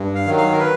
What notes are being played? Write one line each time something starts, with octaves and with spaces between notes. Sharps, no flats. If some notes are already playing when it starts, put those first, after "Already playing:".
Already playing: G2
F5
D#3 F#3
F5
A#4
B4